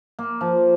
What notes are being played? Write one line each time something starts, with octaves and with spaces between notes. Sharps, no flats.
A#3
F3